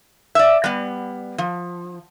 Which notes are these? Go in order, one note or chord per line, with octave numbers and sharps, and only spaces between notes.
D5 E5
G3 B3
F3